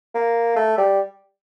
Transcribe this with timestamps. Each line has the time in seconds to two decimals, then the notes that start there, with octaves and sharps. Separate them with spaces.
0.14 A#3
0.56 A3
0.78 G3